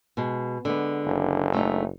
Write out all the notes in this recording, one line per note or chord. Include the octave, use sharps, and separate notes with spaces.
B2 G#3
D3 G#3 B3
F#1
A3 D4 D#4